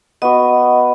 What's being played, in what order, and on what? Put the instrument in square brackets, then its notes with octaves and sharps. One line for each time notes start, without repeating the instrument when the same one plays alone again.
[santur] B3 F#4 [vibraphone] D#5